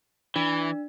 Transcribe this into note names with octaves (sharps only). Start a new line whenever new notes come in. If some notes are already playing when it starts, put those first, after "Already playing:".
E3 D4